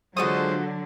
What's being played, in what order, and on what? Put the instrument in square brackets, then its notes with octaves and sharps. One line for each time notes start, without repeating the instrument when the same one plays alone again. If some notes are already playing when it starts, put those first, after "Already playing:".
[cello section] D3 F#3 [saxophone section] G#3 F4 [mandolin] F#4 A4 D#6 [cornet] C5